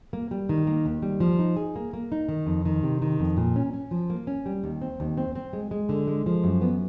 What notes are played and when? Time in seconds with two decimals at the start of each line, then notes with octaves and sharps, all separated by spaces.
0.13 A#3
0.31 G3
0.49 D#3
0.67 A#3
0.86 D#2
1.02 G3
1.20 F3
1.39 D#4
1.56 G#4
1.76 A#3
1.93 A#3
2.12 D#4
2.29 D#3
2.47 F2
2.65 D#3
2.83 C3
3.02 D#3
3.20 F2
3.37 A#2
3.56 C#4
3.73 C#4
3.91 F3
4.10 A#3
4.27 C#4
4.46 G3
4.64 D#2
4.82 C4
5.00 D#2
5.17 C4
5.35 C4
5.53 G#3
5.71 G#3
5.89 D3
6.07 G#3
6.26 F3
6.44 F#2
6.62 B3